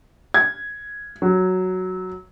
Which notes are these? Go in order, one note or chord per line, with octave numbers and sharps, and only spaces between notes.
G#6
F#3